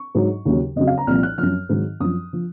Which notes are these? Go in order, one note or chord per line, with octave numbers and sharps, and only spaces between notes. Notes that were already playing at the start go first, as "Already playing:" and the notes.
Already playing: C#6
G#2 F#3
D#2 C#3 F#3
F2 C#3 F#3 D#5
F5
A#5
C2 A#2 F3 F6
F#6
F#2 F3 F6
G#2 D#3 F#3
F#2 F3 D#6
F3